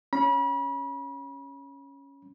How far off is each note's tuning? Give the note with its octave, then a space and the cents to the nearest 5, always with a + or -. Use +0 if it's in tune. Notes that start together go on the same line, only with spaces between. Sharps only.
C#4 +0 B5 -35